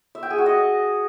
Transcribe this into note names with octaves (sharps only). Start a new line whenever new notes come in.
E5
G5
G#4
F#4
D#5